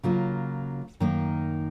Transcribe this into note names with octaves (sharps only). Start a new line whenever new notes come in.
C#3 F#3 A#3 F4
F#2 D#3 A#3 D#4